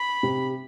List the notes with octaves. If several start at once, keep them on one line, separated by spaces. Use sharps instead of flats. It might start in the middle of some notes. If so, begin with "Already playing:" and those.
Already playing: B5
C3